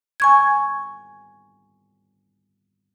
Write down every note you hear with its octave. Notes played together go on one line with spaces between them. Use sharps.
G#5 C#6 G#6